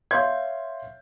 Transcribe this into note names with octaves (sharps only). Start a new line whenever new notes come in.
C#5 E5 F5 C6 G6 G#6